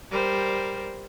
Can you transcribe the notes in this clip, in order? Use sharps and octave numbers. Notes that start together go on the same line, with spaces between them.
G3 A#4 C5